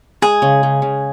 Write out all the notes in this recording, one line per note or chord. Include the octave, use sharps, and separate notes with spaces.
G#3 G#4
C#3
C#3
C#3